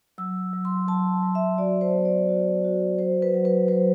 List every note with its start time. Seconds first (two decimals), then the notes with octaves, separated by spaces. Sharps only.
0.18 F#3 E6
0.53 F#3
0.65 C6
0.88 F#3 A5
1.23 F#3
1.35 E5
1.58 F#4 D5
1.81 C5
1.94 B3
2.05 D5
2.29 F#4
2.64 F#4
2.98 F#3 C5
3.22 B4
3.34 F#3
3.45 B4
3.68 F#3 C5